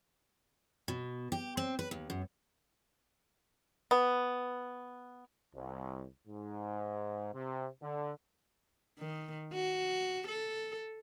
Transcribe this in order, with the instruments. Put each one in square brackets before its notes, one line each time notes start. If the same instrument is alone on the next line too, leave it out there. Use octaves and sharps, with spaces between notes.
[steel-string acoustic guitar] B2
G4
C4
B4
D#2
F#2
[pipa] B3
[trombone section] C2
G#2
C3
D3
[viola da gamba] D#3
F#4
A4